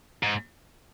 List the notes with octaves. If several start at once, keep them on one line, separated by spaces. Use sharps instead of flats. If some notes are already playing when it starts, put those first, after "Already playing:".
G#2